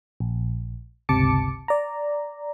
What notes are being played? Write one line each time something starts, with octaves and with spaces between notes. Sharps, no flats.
A#1
G1 C#2 C3 A5 D6 C#7
D5 A#5